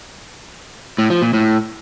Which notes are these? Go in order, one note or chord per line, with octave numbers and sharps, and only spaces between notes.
A2
F3
A#2
A2